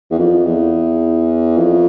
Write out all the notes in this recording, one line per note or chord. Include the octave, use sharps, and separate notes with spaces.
E2
F2
E2
F2